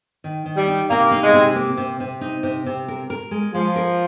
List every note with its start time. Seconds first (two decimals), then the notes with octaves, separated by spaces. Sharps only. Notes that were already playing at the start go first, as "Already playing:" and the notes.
0.24 D#3
0.46 D#3
0.57 G3
0.67 D#4
0.90 C3 A#3
1.11 D#4
1.22 G#3
1.33 C3
1.56 A#3
1.77 C3
2.00 C3
2.21 D#4
2.43 C3
2.66 C3
2.88 A#4
3.10 A#4
3.31 G#3
3.54 F3 G#3
3.76 A#4